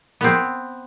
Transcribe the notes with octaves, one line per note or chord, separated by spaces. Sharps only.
B3 C4